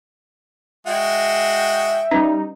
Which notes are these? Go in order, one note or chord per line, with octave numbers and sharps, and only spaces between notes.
G#3 F#4 E5 G5
G3 C#4 D#4 B4